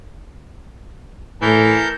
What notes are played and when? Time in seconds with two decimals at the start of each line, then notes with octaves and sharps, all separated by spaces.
1.42 A2 E3 A4 A#4 G6